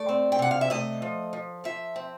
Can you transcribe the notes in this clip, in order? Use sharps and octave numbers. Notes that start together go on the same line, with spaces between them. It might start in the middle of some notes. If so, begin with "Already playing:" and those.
Already playing: A3 D5
C4
G5
C3 F#5
F5
E5
A3 D#5
F3
F3
F3 E5
C4